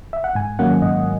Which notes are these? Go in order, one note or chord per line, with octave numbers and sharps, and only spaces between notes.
E5
F#5
G#2 G#5
D#3 F#3 A#3 C#4 F#5
G#2 D#5